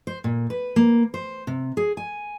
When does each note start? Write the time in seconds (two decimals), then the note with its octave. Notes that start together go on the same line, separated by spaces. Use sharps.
0.07 C5
0.24 A#2
0.50 B4
0.76 A#3
1.14 C5
1.47 C3
1.77 G#4
1.97 G#5